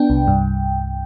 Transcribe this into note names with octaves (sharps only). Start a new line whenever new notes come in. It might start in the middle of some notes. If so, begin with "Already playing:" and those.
Already playing: B3 D4 G5
C2
G2